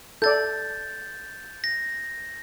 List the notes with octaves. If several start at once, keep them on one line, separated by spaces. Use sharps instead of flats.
A4 D5 G6 A6
A#6